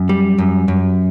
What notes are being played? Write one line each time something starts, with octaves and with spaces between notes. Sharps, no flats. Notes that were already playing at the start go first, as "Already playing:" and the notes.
Already playing: F#2
G3
F#2
F#2